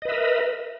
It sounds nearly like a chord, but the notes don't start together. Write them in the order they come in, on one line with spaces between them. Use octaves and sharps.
D#5 B4 E5 A#4